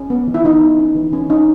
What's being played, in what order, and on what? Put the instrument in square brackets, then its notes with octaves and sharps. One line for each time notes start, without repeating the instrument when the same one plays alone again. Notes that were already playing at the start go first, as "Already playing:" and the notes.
Already playing: [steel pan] C#4
B3
E3
E4
E3 D#4
B3
C#4
E3
E3 C#4
C#4 D#4